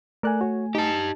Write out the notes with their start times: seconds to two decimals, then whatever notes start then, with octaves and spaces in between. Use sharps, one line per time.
0.23 A3 A#4 D5 G#5 F#6
0.41 F#4 C#5
0.75 D#4 G4 A5